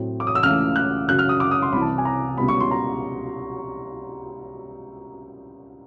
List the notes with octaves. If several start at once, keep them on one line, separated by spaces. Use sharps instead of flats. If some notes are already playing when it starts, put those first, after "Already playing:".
Already playing: A2 F#3 A3 C4
D6
D#6
E6
C#2 C#3 E3 A3 F6
F#6
F#2 C#3 F#3 F#6
F6
D#6
D6
D#6
C6
C2 C3 E3 B5
A5
G#5
A#5
C#2 B2 G3 B3 B5
C#6
C6
A#5